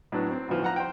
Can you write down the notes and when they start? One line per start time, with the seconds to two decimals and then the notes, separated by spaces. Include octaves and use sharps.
0.12 A2 F#3 B3 D4
0.31 C4
0.49 D2 A2 F3 B3
0.63 F3 F#5 A#5
0.76 C5 G5